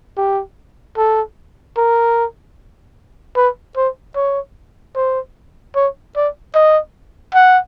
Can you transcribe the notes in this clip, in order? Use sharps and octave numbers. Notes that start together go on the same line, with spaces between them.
G4
A4
A#4
B4
C5
C#5
C5
C#5
D5
D#5
F#5